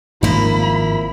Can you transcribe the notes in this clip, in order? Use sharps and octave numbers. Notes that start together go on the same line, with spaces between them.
G#1 G#2 F3 A#3 E4 B5